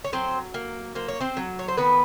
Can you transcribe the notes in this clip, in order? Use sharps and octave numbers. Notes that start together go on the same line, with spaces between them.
C#5
F#3 C4 C5
A#3
A#3 C5
C#5
C4 C5
F#3
C#5
C5
D#3 B3 B4